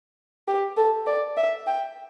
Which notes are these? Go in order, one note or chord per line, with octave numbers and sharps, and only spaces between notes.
G4
A4
D5
E5
G5